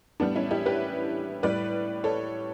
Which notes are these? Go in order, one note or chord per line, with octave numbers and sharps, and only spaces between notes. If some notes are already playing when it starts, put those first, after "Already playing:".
A2 G3 B3 D4
C#4 E4
E4 G4
G4 B4
A2 G3 B4 D5
A4 C#5